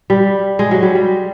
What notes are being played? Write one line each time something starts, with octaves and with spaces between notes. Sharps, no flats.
G3
G#3
F#3
G3
G3